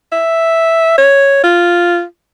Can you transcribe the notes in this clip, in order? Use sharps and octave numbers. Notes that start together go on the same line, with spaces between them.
E5
C#5
F4